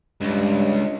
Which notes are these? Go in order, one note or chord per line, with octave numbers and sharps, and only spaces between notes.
C#2 G2